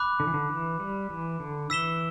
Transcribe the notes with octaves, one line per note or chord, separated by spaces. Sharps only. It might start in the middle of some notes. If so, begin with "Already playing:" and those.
Already playing: B5 D6 F#6
D3
E3
D3
E3
G3
E3
D3
E3 E6 B6 E7 G7